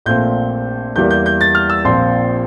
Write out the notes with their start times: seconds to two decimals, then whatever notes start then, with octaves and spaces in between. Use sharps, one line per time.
0.06 A#1 A#2 A3 C4 G6
0.96 E2 E3 G3 A#3 G6
1.11 G6
1.26 G6
1.41 A6
1.55 F6
1.70 E6
1.84 A#1 A#2 F3 C4 C6